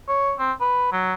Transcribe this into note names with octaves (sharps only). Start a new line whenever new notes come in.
C#5
C4
B4
F#3